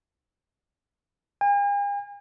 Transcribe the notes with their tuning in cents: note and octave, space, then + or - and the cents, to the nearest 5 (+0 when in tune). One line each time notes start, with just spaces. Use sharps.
G#5 -45